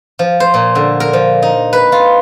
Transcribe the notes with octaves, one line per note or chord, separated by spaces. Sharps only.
F3
C5
A#2
D3
A#4
F3
D#4
B4
F4